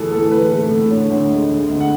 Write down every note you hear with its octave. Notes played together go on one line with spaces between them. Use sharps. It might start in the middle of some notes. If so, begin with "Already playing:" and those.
Already playing: A2 E3 G#4 A4
A2 A4
E3 B4
A3
A2
D3 C#5
D2
G#3
G#3
D2
F#5